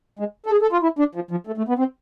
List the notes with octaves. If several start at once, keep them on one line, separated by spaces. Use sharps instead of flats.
G#3
A4
G#4
A4
F4
E4
D4
F3
F3
A3
A3
B3
C4